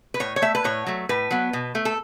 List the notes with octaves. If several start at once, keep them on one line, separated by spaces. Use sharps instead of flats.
B4
A2 C#5
C#5
A3 E5
B4
A2 C#5
F#3 A3
A2 B4
F#3 B3
B2
A3
A4